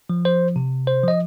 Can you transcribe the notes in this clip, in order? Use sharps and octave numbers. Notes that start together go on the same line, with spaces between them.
F3
C5
C3
C5
F3 D#5